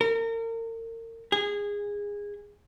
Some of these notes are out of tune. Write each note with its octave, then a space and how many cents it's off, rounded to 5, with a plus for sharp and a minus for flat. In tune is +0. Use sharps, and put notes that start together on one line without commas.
A#4 -35
G#4 -20